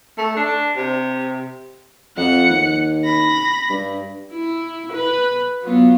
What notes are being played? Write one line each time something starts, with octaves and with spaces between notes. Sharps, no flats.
A3
D4
C3
F2 F#5 C#7
D#2
B5 A#6
G2
E4
B4
F#3 B3 F4